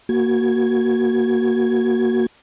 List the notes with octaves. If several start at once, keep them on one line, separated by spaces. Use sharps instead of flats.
A#3 F#4 G#6